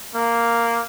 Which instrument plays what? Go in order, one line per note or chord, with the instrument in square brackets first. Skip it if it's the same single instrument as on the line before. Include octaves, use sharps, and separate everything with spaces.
[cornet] A#3